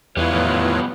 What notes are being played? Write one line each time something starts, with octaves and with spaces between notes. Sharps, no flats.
E2 G3 B3 E4 F4 B4 C#5
A2 D#3 F3